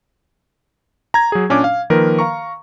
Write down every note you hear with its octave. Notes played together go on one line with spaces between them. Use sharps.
A#5 G#6
F#3 G#4
A#2 C#4 D4 D6
F5
D#3 F3 A#3 A#4 B4
F5 A#5 C#6